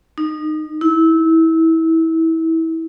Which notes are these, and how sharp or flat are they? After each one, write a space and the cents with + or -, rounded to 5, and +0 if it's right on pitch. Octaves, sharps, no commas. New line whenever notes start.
D#4 -25
E4 -25